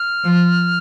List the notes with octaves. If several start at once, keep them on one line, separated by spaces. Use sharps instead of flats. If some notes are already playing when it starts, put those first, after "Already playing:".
Already playing: F6
F3